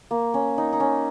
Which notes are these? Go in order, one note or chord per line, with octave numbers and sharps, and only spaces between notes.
A#3
C#4
D#4
D#4
C#4